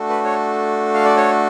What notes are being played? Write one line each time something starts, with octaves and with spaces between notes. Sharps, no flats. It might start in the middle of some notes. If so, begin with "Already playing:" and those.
Already playing: A3 D4 F#4 A4
B4
C#5
F5
D5
C#5